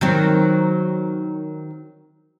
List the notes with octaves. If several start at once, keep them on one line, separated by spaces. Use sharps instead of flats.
D#3 F#3 C4